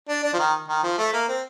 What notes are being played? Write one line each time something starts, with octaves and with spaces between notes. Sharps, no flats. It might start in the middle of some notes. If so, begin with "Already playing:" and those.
D4
D4
F3
D#3
D#3
F3
A3
A#3
C4